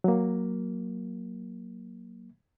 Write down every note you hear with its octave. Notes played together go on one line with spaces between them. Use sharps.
F#3 A#3